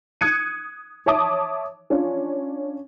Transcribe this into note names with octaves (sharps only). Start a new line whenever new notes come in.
D#6 F#6 G#6 C#7 D#7
C#5 E5 A5 D6 D#6
C#4 D4 F4